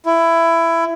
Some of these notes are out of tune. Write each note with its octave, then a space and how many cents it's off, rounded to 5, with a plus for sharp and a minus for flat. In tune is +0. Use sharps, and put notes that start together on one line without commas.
E4 +15